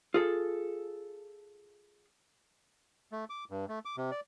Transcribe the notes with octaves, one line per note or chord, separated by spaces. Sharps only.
F4 G#4 A4
A3
D6
G2
A3
D6
C3
D5